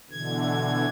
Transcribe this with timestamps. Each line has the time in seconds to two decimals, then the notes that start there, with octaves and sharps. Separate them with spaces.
0.11 B2 D3 E3 G#6